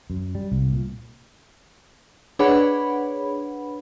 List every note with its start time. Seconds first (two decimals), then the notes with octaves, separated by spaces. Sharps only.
0.10 F#2
0.35 G3
0.52 C2
0.73 A#2
2.39 D4 G#4 B4 C#5 F#5 B5